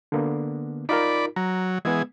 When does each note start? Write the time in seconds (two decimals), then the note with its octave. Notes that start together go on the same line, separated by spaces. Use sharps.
0.12 D3 A#3 B3
0.89 D#4 F4 A#4 D5 B5
1.36 F#3 A#5
1.85 E3 G#3 B3 G#4